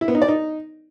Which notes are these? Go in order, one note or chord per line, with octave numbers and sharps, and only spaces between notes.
E4
B3
D#4
D5
D#4